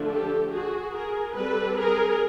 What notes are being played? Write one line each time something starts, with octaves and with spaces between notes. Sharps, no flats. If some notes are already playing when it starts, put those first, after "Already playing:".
Already playing: D3 F3 A3 D4
G4 A4
F#4 G#4
G#4 A#4
G3 C4 A4 B4
G#4 A#4